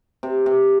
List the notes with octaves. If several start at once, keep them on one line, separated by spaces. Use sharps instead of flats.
C3
C3